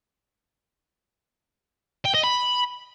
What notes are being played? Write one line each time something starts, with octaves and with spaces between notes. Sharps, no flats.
G5
D#5
B5